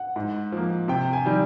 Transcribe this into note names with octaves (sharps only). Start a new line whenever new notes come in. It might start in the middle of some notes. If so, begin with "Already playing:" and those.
Already playing: F#5
G#2
F3 A#3
C3 G5
G#5
D#3 G3